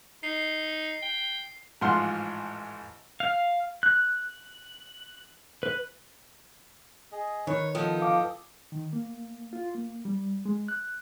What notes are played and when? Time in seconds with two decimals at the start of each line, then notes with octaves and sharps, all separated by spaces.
0.23 D#4 C7
1.02 G5
1.81 A1 G#2 F3 F#5 C6 F6
3.20 F5
3.83 F#6
5.63 B4
7.12 G#4 D#5
7.47 D#3 B4 C#5
7.75 F3 B3 D#4 A4 G5 D#6
8.01 F5 D6
8.72 D#3
8.93 A#3
9.53 F4
9.75 A#3
10.05 G3
10.46 G#3
10.68 F#6